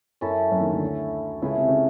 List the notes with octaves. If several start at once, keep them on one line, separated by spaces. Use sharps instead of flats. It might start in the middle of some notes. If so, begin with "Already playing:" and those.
F#2 F#3 C#4 E4 A4
F#2 F#3
D#2 D#3
D2 D3
C#2 C#3 A3 C#4 E4 G#4
C3
C#3